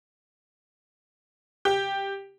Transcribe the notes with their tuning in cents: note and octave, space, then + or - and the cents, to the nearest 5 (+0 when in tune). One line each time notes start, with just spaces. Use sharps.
G4 +5